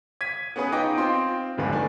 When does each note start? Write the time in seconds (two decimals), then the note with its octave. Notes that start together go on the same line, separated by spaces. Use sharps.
0.21 G#6 B6 D#7
0.56 B3 C#4 G#4 B4 D#6
0.72 D#4 F4 D#5 G5 D6
0.98 C4 F4 G5 C6
1.57 D1 G#1 E2 G#2 F3 B4
1.72 A3 D4 G#5